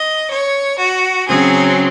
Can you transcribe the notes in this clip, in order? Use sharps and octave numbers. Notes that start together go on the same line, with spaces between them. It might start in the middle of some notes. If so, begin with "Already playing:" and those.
Already playing: D#5
C#5
F#4
C#3 F#3 C4 G#4